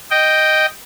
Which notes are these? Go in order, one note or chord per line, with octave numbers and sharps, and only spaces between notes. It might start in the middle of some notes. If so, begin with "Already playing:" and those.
D#5 G5